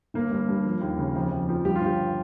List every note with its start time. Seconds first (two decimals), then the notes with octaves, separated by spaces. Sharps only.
0.14 G1 A#3
0.31 G2
0.49 G2
0.65 F3
0.81 D#2
0.98 C#3
1.15 F2
1.31 F2
1.49 F3
1.65 G2 G4
1.76 F4
1.81 G1 G4